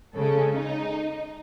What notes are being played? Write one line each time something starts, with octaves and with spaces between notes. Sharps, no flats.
C#3 G#3 C#4 A4
D#4